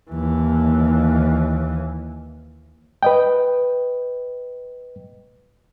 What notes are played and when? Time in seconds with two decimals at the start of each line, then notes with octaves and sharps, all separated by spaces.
0.11 D#2 E3
3.03 B4 D#5 G5